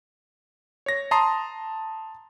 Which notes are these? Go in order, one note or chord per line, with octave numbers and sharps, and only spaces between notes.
C#5 A#6
A5 A#5 C6 D#6 C7